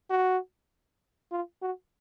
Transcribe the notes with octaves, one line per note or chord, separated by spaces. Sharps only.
F#4
F4
F#4